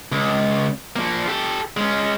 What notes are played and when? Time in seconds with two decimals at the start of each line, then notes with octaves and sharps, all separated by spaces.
0.12 C#2
0.96 F3 A#3
1.28 G4 A4
1.77 G#3 C#4